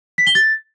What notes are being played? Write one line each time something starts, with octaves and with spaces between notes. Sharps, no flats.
B6
G7
A6